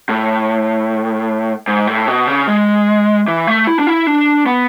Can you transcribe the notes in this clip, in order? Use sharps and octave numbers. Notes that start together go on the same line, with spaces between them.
A2
G#2
A2
B2
C#3
G#3
E3
A3
E4
D4
E4
D4
B3